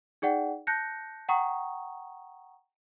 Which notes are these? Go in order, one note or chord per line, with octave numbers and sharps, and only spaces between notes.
D#4 G#4 D5 F#5 G5
A5 F#6 G6 A#6 C#7
F#5 G5 A#5 C#6 D#6